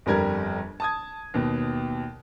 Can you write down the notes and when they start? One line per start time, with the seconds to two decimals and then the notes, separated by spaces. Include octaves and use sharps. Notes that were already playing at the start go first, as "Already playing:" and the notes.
0.06 G1 F2 G3 A#4 G#6
0.80 A5 D#6 G#6
1.34 D#2 B2